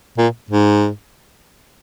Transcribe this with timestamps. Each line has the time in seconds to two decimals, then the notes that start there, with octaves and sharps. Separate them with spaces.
0.18 A#2
0.50 G#2